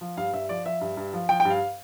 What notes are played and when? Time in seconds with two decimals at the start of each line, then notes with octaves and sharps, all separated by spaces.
0.01 F3
0.17 G2 F5
0.33 G2 E5
0.49 F3 D5
0.65 F3 E5
0.81 G2
0.97 G2
1.13 F3
1.29 F3 G5
1.40 G2 G5
1.50 F5